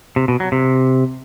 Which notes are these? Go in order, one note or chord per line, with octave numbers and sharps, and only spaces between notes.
C3
B2
F#3
C3